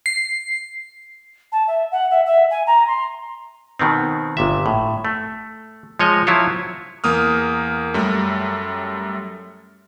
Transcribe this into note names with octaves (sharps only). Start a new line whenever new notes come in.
C7
A5
E5
F#5
E5
E5
G#5
A#5
C6
B2 D#3 B3 C4
G1 A#2 E5
A2
A3
F3 G#3 C#5 D#5
F3 F#3 E4 F4 C#5
E2 A#3 D#6 F6
F#2 G3 A3